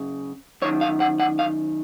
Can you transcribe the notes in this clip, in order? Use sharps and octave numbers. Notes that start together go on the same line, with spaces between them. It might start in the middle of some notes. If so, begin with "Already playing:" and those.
Already playing: F#2 C#3
F#2 D#3 C#5
F5
F#5
F#5
F5